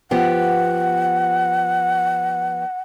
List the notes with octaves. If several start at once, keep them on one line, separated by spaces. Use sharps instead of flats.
F3 B3 G4 F#5